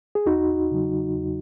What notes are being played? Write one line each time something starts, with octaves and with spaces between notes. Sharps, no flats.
G#4
E2 D#4 F#4
C#3 F#3
E2